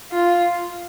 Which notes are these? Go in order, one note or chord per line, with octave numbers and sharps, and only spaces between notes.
F4